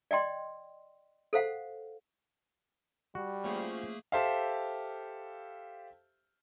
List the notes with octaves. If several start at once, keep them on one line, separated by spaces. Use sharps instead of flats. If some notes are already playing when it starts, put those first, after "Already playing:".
D5 D#5 G5 C6
A4 C5 F5 F#5
G3 F#4
F3 A3 A#3 C#4 G#4
G4 A4 C5 E5 F5